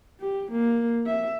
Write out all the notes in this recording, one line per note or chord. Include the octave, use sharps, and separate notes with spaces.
G4
A#3
E5